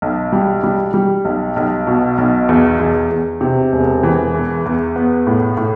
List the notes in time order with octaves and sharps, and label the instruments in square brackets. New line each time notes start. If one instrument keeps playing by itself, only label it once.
[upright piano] B1
G3
G3
G3
B1
B1
B2
B1
E2
E2
E2
C3
E1
E3
E2
E2
B3
A2
A2